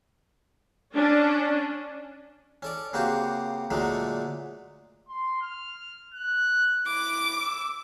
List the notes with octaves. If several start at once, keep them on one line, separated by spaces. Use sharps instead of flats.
C#4 D4
C#4 A4 D5
C#3 A#3 C4 F#4 G4
A#2 D3 F#3 G#3 A3
C6
F6
F#6
E4 D6
E6